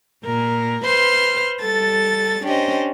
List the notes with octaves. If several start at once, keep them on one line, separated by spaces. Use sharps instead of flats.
A#2 A#4
B4 C5 C6 F6
G3 A4 A6
C#4 D4 G4 C5 D#5